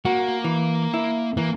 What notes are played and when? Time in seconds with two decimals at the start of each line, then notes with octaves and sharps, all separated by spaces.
0.05 A#3 F#4
0.44 E3
0.94 E4
1.37 E3 A#3